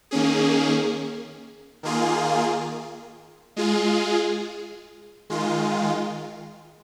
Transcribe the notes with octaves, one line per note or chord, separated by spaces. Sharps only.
D#3 A#3 C#4 G#4
D#3 A#3 F4 G#4
G#3 F4 G#4
D#3 G#3 F4